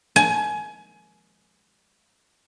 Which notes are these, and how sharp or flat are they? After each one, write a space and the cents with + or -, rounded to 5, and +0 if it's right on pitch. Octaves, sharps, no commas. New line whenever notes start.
G#5 +25